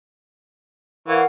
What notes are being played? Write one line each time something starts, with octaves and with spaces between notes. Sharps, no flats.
E3 A#4 C#5 F5 F#5